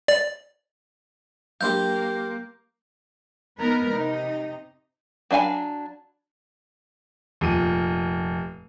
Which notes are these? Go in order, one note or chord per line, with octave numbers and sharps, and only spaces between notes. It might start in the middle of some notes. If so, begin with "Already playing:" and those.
D5
F#3 A#3 D4 G4 C5 F5 G5 G6
B3 D#4 A#4 B4
C3 D#4
F#3 D4 F5 G#5 B5
F1 A#2 D#7